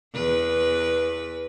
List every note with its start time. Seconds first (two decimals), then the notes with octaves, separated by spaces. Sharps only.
0.14 E2 B4